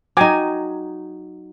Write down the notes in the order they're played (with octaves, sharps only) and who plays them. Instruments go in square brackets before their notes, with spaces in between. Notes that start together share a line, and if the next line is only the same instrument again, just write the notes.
[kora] F#3 D#4 [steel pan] G5 G#5 D6